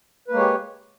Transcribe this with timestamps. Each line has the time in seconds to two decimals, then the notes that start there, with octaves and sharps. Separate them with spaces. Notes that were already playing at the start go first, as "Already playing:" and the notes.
0.28 B4
0.31 A#3
0.34 G#3
0.36 C#5
0.39 G4